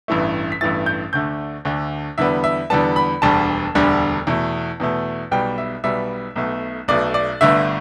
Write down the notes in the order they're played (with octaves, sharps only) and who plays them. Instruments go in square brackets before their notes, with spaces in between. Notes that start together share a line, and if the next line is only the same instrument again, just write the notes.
[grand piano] A1 G2 E3 A3
B6
A1 G2 E3 A3 A6
G6
D2 D3 A3 G6
D2 D3 A3
E2 D3 G3 B3 E5
E5
E2 D3 G3 B3 A5
B5
E1 D2 D3 G3 A5
E1 D2 D3 G3
E2 B2 A3
E2 B2 A3
B1 B2 G3 B3 G5
E5
B1 B2 G3 B3 E5
B1 B2 A3
B1 B2 A3 D5
D5
G1 G2 D3 A3 E5